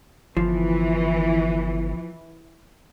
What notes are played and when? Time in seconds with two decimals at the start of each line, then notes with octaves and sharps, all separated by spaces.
0.37 G1 E3 F3